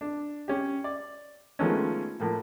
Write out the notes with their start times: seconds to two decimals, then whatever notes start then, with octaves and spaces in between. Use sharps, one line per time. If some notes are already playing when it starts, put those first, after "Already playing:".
0.01 D4
0.48 C#4 G4
0.84 D5
1.59 D#3 F3 G#3 A3 B3 C#4
2.20 A2 F3 A#3